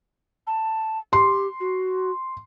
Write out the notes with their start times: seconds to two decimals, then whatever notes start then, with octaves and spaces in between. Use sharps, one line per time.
0.47 A5
1.13 G4 C6
1.60 F#4